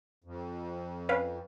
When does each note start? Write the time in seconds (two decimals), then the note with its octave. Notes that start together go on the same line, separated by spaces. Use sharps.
0.24 F2
1.09 C#4 B4 F5